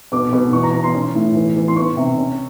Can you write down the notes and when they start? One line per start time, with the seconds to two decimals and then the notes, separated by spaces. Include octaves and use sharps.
0.12 B2 D6
0.33 B2
0.53 E3 C#6
0.63 A#5
0.73 E3 A#5
0.84 C6
0.94 C#4
1.15 A2
1.35 E3
1.56 E3
1.68 C6
1.76 B3 C#6
1.97 C3
2.18 C#4